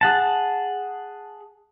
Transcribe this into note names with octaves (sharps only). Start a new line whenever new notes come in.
G#4 F#5 A5